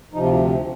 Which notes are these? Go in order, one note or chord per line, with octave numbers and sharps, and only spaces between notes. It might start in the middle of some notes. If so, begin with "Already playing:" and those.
D2 C3 F3 D#4
F4